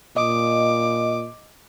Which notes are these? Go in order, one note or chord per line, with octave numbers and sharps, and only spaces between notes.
A#2 D#5 D6